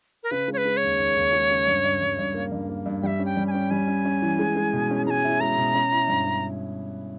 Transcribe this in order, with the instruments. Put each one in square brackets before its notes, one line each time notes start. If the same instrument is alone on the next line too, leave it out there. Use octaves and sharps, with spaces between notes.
[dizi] A#4
[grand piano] C#3 [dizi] B4
[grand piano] G#3
[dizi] C#5
B4
[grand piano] G#3
[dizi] C#5
[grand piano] D#2
D#2
D#2
G#3
C#3
G2
G2
G2
G2
A#3
G2
A#3
G2
[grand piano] G3 [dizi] E5 G5
[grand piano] C#4
[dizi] G5
[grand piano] G3
[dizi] G#5
[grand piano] C#4 [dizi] G5
[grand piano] G3 [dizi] G#5
[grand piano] C#4
C#4
E3
G#3
G#3
B2
C#4
[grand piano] G#3 [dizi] G#5 A#5
[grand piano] E4
[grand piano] G#3 [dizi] A#5
[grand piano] B2
C#4
E4
G2
C#4